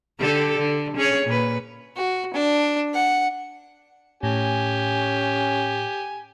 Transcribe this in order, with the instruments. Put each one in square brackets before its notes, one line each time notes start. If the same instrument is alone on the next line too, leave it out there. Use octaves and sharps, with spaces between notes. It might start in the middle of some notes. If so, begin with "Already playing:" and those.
[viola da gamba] D3 G4 A4
D3
C#4 G#4 C#5
A#2 B4
[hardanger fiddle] F#4
D4
F#5
[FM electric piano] A2 [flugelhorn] C#4 [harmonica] G4 G#5